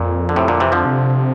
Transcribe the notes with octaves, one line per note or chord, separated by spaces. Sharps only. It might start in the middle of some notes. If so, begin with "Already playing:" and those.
Already playing: F2 A#2
D3
A2 C3
A#2 D3
C3 E3
D3 F3
C3